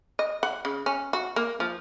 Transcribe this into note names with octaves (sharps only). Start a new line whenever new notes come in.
D#5
F#5
C#3
C#4
F#4
A#3
F3